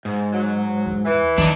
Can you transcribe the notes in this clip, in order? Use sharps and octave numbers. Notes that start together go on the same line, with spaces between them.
G#2
F#3
E2
E3
D#3 D4 D#4